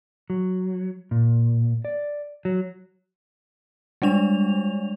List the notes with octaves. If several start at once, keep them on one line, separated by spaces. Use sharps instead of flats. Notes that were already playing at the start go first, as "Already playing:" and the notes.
F#3
A#2
D5
F#3
G3 G#3 D4 F7